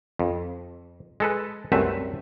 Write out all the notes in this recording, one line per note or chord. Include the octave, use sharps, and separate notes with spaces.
F2
G#3 A4 B4
C2 F#2 A3 C4 B4 E5